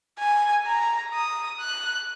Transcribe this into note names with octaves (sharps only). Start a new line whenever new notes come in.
G#5
A#5
D#6
F#6